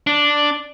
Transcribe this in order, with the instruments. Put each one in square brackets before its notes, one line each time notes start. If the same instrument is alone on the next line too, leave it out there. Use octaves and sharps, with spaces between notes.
[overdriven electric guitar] D4